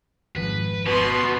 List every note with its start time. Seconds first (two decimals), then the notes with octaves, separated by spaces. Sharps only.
0.36 G#1 F2 G#2 B4
0.86 B2 F3 B3 B4 C6